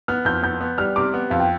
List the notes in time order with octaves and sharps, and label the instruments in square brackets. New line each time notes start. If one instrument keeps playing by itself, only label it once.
[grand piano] B3 [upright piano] F6
[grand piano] F2 [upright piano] G6
[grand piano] B3 [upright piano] G6
[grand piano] B3
[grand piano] G3 [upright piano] F6
[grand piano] C3 [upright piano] D6
[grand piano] B3
[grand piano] F2 [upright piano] F5
[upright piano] G5